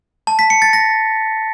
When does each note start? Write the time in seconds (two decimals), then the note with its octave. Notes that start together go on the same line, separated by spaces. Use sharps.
0.27 A5
0.39 B6
0.50 C#7
0.62 A6
0.73 A#6